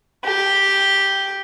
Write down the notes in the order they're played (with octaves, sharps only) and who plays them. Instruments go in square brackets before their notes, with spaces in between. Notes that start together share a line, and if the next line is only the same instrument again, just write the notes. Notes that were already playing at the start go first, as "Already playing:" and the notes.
[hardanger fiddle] G4